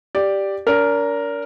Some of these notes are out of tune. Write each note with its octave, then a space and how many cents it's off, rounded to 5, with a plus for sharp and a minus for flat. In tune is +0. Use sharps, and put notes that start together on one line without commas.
G4 +0 D5 +0
D4 -40 A#4 +0